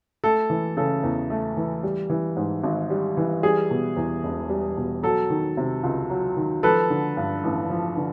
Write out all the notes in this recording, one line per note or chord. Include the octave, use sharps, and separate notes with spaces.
A3 A4
E3
C#3 A4
E2
A3
E3
G3
E3
G#2
G#1
G3
E3
G3 G#4
B2
E2
E1
G3
B2
F#3 A4
D#3
C3
C#2
F#3
D#3
F3 A4 B4
D3
G2
A1
F3
D3